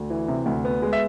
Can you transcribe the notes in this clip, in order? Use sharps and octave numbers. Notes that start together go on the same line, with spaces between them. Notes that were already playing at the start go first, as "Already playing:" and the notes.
Already playing: D2
E3
C3
D2
B3
G#3
E5